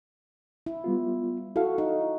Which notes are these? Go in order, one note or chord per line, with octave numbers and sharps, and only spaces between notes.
E4
G3 B3 F4
E4 F#4 A4 F5
D#4